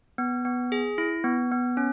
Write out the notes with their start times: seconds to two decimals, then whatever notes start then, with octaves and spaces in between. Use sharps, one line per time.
0.18 B3
0.45 B3
0.72 G#4
0.98 E4
1.24 B3
1.51 B3
1.77 C#4